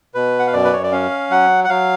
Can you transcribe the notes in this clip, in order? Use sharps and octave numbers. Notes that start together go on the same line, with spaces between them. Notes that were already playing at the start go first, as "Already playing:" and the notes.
B2 B4
F#5
F5
F#2 D5
B4
C#5
D5
C#4 F5
F#3 F#5
F#5
F#3 F5